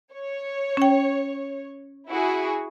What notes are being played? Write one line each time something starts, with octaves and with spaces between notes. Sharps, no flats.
C#5
C#4 G5
E4 F#4 G#4